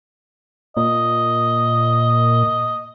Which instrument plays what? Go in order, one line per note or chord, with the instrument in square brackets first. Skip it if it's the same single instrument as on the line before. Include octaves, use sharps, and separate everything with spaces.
[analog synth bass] A#2 [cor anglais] D#5